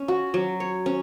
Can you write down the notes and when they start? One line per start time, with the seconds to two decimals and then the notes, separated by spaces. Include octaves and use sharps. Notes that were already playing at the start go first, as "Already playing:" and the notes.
Already playing: C#4
0.08 F#4
0.34 F#3
0.60 C#5
0.86 C#4